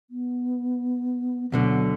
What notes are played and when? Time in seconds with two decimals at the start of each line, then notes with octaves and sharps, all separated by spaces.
0.10 B3
1.52 D2 B2 D3 F#3